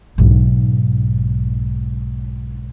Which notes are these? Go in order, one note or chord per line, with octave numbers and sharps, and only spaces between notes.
B1 G#2